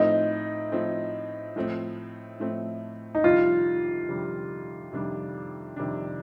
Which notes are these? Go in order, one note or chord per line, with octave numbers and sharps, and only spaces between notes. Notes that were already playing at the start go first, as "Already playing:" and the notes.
Already playing: A2 F3 A3 C4 D#4
A2 F3 A3 C4
A2 F3 A3 C4
A2 F3 A3 C4
D#4
F2 C3 D#3 G3 D4 F4
F2 C3 D#3 G3 D4
F2 C3 D#3 G3 D4
F2 C3 D#3 G3 D4